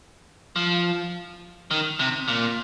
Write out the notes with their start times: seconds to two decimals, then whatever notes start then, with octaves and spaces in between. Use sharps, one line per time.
0.56 F3
1.71 D#3
1.99 C3
2.28 A#2